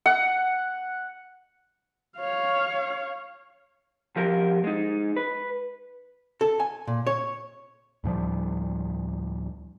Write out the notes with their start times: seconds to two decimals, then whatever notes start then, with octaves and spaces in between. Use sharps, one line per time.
0.06 F#5
2.18 C#5 F5
4.16 C2 F3 G4 A#4
4.64 G#3 D#4
5.17 B4
6.41 A4
6.60 G#5
6.87 A#2
7.07 C#5
8.04 D2 A2 F3 G3